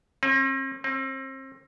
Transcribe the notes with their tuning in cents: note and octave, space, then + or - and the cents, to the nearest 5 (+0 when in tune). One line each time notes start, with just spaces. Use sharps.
C4 +45
C4 +35